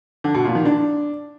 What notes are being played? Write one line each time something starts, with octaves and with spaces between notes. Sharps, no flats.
D3
B2
A#2
D#3
D4